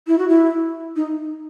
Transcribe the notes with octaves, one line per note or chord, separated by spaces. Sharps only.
E4
F#4
E4
D#4